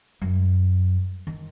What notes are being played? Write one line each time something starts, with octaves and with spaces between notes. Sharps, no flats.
F#2
D#3